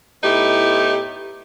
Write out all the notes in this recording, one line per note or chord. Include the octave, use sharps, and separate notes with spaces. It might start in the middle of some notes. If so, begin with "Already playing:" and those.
A2 B3 D#4 E4 G4